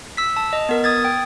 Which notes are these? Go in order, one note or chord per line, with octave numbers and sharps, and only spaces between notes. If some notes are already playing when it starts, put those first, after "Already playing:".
E6 B6
A5
D#5
B3 A#4
D#6 G#6 A6
G5